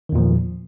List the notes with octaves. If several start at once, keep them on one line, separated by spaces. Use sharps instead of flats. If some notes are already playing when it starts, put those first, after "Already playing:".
E2 A#2 D#3 F3